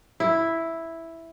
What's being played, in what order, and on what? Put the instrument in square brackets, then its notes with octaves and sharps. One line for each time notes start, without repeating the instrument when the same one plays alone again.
[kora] E4